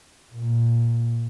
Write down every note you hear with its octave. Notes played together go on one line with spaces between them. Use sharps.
A#2